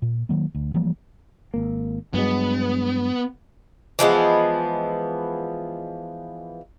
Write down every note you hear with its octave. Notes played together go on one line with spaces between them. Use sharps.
A#2
D#3 F#3 A#3
D2
E3 F3 G3 A#3
G#1 A#3
G2 F#3 G#3 B3
E3 F3 G#3 B3